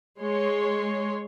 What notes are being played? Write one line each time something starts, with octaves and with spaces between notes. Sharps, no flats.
G#3 C#5 C6